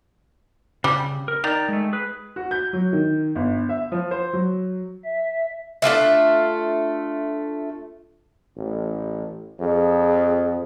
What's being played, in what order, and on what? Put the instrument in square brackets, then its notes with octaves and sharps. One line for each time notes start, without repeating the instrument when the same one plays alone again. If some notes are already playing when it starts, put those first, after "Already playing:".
[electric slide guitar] C#3 [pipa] G3
[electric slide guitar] A#4
[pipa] D#3 [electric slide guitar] D5 A#5
[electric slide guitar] G#3 A3
G#4 B4
[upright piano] F#4
G6
F#3
D#3
G1
E5
F3
C5
F#3
[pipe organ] E5
[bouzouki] A3 D4 F4 E5
[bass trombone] A1
[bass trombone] F2 [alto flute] G#4